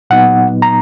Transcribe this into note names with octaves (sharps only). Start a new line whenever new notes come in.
A#2 F#3 B3 D#4 F#5
A#5